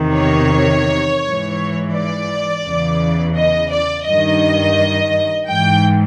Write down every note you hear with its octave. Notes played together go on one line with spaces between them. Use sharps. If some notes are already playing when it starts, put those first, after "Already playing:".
Already playing: E2 C3 D#3
C#5
G#2
E3
D5
E2 C#3 E3
D#5
D5
G2 D#3 D#5
G#2 E3 G5